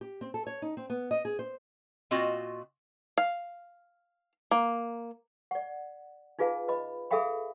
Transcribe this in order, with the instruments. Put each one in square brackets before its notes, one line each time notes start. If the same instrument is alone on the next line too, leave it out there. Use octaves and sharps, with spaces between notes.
[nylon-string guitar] G4
C4
A4
C#5
D#4
C4
B3
D#5
G#4
C5
[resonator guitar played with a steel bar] A#2 C4 F4 F#4 D#5
[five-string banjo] F5
A#3
[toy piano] D5 F#5
D#4 F4 G#4 B4 F5 A5
B4 D#5 B5
G#4 A4 E5 F5 G5 B5